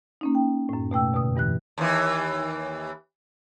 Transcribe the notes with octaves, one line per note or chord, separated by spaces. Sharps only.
A#3 C#4 D#4
G5
F#2 A2
B2 A3 G5 E6
F2 B2 D3 D#6
E2 G2 E3 F#6
D#2 E3